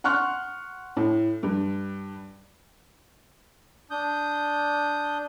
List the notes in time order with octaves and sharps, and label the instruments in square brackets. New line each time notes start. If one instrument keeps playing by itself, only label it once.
[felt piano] F#5 C6 C#6 F6 F#6
A2
G2
[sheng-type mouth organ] D4 D#6 G6